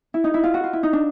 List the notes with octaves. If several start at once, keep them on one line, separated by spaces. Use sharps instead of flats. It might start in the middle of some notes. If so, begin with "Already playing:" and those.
E4
D#4
E4
F4
F#4
F4
E4
D#4
D4